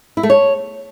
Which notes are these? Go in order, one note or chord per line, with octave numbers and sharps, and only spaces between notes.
E4
A3
C#5